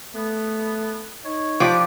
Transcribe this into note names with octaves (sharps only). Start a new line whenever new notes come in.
A3 B3
D#4 C#5
F3 D4 G4 D6